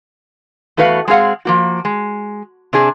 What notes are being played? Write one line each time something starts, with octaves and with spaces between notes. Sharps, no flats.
E2 A3 F#4 B4 F5
G#3 C4 G#4 F5 F#5
F3 A#3 F#4
G#3
C3 D4 G#4